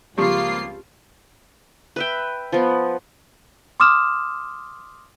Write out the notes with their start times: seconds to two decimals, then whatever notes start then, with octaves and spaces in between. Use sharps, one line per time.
0.18 C#2 F3 G3 A#3 C4 F4 G4 C7
1.96 B4 E5 G5
2.52 F3 B3
3.80 C6 D6 D#6 F6 E7